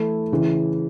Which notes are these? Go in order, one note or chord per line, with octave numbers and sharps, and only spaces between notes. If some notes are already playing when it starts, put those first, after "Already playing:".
Already playing: E3 A3 E4
C#3 E3